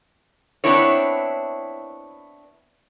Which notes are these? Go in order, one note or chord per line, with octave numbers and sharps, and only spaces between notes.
B3 C4 D4 E4 C#5